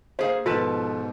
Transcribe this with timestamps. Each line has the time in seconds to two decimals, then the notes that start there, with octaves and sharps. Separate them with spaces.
0.19 A#3 G#4 C5 F5
0.46 G#2 B2 F3 F4 A4 B4 A5